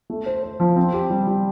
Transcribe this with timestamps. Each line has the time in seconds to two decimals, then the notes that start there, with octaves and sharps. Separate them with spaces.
0.10 A3
0.26 C5
0.43 C5
0.60 F3
0.76 C4
0.93 G4
1.10 G3
1.27 G3